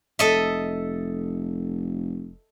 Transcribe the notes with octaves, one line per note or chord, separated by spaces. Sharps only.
F1 A4 D#5 E5